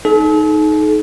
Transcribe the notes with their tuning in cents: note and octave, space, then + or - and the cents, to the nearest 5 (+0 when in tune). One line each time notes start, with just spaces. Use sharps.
D#4 +0 A4 -45